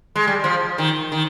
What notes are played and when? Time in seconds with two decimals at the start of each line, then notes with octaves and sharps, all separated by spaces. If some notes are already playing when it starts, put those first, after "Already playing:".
0.16 G#3
0.27 G3
0.44 F3
0.78 D#3
1.12 D#3